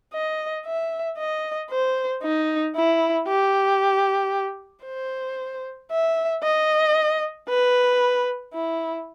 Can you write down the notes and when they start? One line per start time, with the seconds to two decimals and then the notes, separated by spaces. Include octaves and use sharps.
0.13 D#5
0.66 E5
1.18 D#5
1.71 C5
2.23 D#4
2.76 E4
3.28 G4
4.85 C5
5.91 E5
6.43 D#5
7.49 B4
8.54 E4